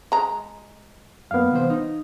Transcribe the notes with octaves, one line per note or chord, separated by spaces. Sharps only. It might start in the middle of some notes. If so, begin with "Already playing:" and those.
G#3 A#5
F#2 A#3 B3 F5
C2 E3 C5
D#4